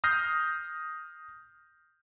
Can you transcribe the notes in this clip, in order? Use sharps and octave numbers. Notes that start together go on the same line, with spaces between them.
D#6 F6 G6 A#6 C7